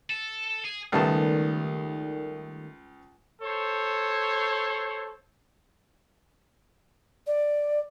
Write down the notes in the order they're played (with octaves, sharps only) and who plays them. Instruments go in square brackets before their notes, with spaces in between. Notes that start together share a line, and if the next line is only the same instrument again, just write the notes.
[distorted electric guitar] A4
G#4
[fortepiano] C#2 B3 A5 [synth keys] D#3 G3 A3
[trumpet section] A4 C5 C#5
[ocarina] D5